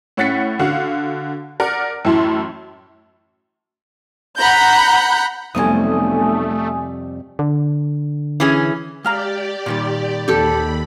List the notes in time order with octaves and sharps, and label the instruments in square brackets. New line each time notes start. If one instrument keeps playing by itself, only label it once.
[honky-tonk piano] A2 C#4 F#5 A6 B6 C#7
D3 F#4 F5 F#5
A#4 D5 F#5
F#2 A2 E3 E4 A5 C6
[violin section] F#5 A#5 B5 G6
[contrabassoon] B1 [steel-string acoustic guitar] F2 C3 G3 [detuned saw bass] A3 [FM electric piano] G#5 D#6
[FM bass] D3
[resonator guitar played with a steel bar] E3 C#4 G#4
[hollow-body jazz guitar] G#3 F5 A#5 [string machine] G4 D5
[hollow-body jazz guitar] A#2 D#3 G3
[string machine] D#2 B5 [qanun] G4 A4